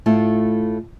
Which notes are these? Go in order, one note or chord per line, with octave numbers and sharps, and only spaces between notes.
A2 A3 E4 F4